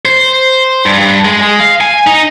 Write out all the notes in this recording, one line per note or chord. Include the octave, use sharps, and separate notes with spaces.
C5
G2
G2
G#3
G#3
F5
G#5
D#4